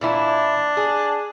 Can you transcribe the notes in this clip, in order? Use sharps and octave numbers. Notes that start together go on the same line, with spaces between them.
A#2 E3 D4 E4
G#4